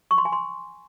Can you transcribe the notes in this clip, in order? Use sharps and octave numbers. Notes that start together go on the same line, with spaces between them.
C#6
C6
G#5
C6